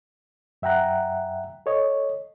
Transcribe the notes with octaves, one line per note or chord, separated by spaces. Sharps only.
F#2 E5 F#5 G5 A#5 F#6
A4 C#5 D#5